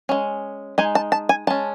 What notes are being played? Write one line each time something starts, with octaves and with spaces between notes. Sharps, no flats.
G#3 C#4
G#3 D#4 G#5
A5
A5
G#5
G#3 C#4 A5